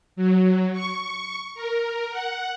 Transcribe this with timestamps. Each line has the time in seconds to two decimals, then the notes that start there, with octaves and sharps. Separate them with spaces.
0.16 F#3
0.72 C#6
1.55 A#4
2.11 F#5